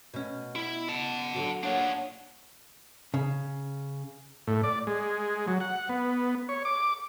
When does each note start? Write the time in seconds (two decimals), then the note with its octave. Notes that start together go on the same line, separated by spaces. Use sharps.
0.14 B2 C#4
0.56 E4
0.89 F#5 A5
1.34 D3 F#3
1.63 A#3 D4 C#5 F#5
3.14 C#3
4.47 A2
4.63 D5
4.87 G#3
5.48 F#3
5.60 F#5
5.89 B3
6.49 C#5
6.65 D6